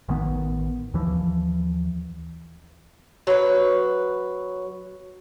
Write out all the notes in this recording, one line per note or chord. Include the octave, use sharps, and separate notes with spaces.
A1 D#3 B3
D#2 E3 F3
F#3 B4